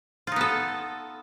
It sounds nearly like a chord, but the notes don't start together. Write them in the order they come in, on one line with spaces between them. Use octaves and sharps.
F4 D#4 B3 A4